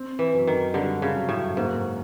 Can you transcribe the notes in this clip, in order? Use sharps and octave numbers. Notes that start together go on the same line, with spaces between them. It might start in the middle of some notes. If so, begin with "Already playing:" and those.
Already playing: C4
E3
F#2
D#3
D3 G3
C#3
F#2
A2
G#2 A#3